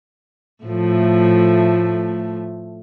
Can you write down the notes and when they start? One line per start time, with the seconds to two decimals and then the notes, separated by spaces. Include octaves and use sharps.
0.64 A2 F3 A3